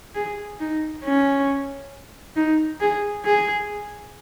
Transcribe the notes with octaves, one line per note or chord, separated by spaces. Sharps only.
G#4
D#4
C#4
D#4
G#4
G#4